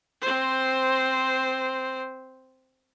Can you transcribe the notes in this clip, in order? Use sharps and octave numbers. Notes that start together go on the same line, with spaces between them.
C4 C5